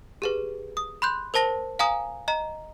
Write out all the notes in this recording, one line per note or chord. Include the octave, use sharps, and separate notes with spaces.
G4 G#4 B4
D#6
B5 C6 F#6 G6
A#4 C5 A5 A#6 G7
F5 G#5 A#5 D#6
D#5 A#5